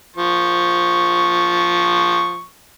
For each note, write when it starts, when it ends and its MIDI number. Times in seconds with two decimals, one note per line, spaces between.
0.16 2.46 53
0.16 2.46 85